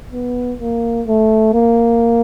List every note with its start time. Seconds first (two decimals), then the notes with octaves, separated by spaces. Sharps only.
0.13 B3
0.60 A#3
1.07 A3
1.54 A#3